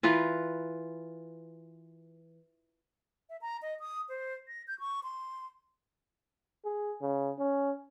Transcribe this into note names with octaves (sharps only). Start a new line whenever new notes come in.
E3 F4 A#4 B4
E5
A#5
D#5
D#6
C5
A#6
G6
C#6
C6
G#4
C#3
C#4